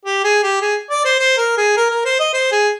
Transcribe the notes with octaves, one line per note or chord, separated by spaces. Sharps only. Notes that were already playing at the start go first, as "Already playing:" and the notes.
G4
G#4
G4
G#4
D5
C5
C5
A#4
G#4
A#4
A#4
C5
D#5
C5
G#4